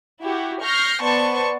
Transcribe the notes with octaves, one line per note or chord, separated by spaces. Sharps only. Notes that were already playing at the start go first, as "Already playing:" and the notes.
E4 F#4 G4
C#6 F6 G6 A#6 C7
B3 C5 D5 A5 C#6